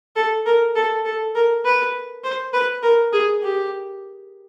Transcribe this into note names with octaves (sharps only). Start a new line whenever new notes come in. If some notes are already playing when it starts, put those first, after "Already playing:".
A4
A#4
A4
A4
A#4
B4
C5
B4
A#4
G#4
G4